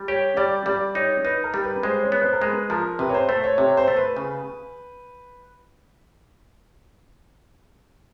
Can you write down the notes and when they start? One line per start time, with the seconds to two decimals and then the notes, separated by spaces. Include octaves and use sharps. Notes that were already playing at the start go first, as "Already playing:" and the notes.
Already playing: G3
0.08 G4 C#5
0.37 G3 D5
0.66 G3 D5
0.95 D#4 C#5
1.24 D#4 B4
1.44 A#4
1.54 G3
1.64 B4
1.83 G#3 C5
2.03 C#5
2.12 B3
2.22 C5
2.33 A#4
2.41 G#3 B4
2.70 F3 A#4
2.99 C3 B4
3.09 C#5
3.14 C5
3.28 A3 C5
3.44 C#5
3.58 C3 C#5
3.77 C5
3.88 A3
3.97 B4
4.17 C#3